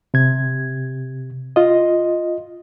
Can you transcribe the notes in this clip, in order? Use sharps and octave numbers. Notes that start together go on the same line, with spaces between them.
C3 G#6
F4 D#5